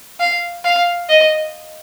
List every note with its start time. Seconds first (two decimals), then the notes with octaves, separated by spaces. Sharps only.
0.20 F5
0.64 F5
1.09 D#5